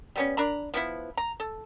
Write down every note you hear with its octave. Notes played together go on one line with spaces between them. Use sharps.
G3 B3 C#4
D4 A#4 A#5 B5
F3 B3 E4
A#5
A4